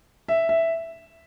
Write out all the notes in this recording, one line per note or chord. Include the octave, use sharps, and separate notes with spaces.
E5
E5